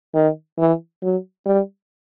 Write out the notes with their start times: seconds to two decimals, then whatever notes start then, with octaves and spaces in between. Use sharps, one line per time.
0.15 D#3
0.58 E3
1.03 F#3
1.46 G3